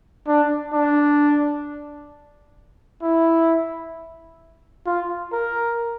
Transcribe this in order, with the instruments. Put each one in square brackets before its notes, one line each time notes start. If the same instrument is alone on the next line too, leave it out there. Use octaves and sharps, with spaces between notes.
[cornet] D4
D4
E4
F4
A#4